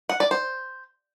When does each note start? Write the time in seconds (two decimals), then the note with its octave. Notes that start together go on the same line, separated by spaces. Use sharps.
0.09 F#5
0.20 D5
0.31 C5